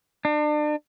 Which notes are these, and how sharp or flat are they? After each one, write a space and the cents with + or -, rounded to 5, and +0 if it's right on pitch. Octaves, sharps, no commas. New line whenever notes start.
D4 +35